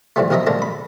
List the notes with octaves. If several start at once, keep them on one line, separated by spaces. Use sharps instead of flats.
A2 D3 E3 F3 G3 A3
B1 F3 A#4 D#5 E5 A#5
C#2 A#2 D3 A4 A#4 A#5
B5